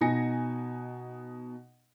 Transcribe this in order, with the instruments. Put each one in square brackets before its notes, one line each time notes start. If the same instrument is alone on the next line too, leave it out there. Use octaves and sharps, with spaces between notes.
[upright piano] B2 D#4 G#5 A#6 C#7